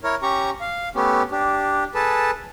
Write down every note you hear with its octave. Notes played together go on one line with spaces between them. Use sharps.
E4 A#4 C#5
C#4 G4 A#5 C#6
F5
A3 B3 C#4 G4
D4 G4
G#4 A4 B4 A5